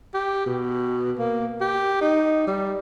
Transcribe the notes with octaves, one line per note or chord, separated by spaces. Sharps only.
G4
B2
A#3
G4
D#4
G3